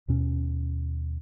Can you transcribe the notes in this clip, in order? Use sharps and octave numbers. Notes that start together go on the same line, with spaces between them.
D#2 B2 C#4